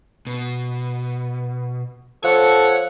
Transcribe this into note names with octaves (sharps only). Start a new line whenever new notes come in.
B2
F3 A4 C#5 F#5